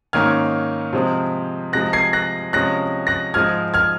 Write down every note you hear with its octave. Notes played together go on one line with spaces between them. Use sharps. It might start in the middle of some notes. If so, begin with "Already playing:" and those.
G#2 D#3 A#3 C#4 F6 G#6
C3 F3 G#3 C4
C3 F3 G#3 F#6 A#6
G#6 C7
F#6 A#6
C3 F3 G#3 C#4 F#6 A#6
F#6 A#6
G#2 F3 G#3 F6 G#6
F6 G#6